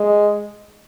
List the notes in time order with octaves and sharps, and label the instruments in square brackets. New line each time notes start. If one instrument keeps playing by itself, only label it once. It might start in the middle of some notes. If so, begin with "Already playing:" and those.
Already playing: [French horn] G#3